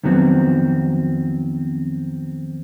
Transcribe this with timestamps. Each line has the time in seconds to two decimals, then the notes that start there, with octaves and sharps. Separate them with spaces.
0.04 F2 D#3 F#3 B3 C4